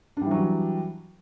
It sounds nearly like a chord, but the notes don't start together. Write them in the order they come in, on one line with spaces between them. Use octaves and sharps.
D4 G3 E3 F#3